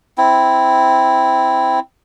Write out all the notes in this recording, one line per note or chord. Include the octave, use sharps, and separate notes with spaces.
C4 E4